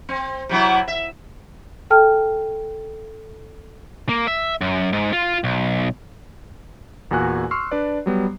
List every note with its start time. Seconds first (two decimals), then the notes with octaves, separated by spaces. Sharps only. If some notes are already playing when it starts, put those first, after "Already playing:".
0.09 C4
0.49 C3 F#3 E4
0.88 E5
1.90 A4 G5 A5 F6
4.09 A#3
4.27 E5
4.61 F#2
4.93 G#2
5.13 F4
5.44 B1
7.11 E2 A#2 F#4 G#5 F#6
7.51 C6 C#6 E6 F6 C7
7.71 D4 B4 D5
8.06 F#3 G3 B3